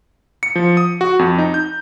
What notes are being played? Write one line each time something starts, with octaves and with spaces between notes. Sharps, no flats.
C#7
F3
D#6
F#4
F2
D#4
G6